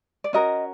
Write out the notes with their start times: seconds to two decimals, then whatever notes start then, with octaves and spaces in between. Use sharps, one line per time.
0.24 D5
0.33 C#4 F#4 A#4 D#5